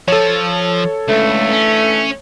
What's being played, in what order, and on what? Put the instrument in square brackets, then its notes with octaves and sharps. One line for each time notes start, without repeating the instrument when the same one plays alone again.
[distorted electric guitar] F3 [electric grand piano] A4 C#5
[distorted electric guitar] C#2 [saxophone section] D3 E3 A3
[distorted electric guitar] C#4